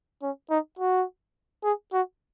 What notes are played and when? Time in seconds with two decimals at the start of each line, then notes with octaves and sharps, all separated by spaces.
0.22 C#4
0.50 D#4
0.79 F#4
1.64 G#4
1.93 F#4